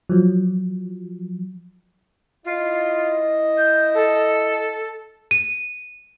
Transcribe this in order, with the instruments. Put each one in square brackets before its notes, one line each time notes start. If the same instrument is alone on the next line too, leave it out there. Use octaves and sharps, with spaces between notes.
[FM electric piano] F3 F#3
[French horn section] E4 D#5 [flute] F4
[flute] G6
A4
[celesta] D#7